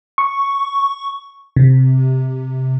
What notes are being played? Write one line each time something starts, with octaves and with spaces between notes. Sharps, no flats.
C#6
C3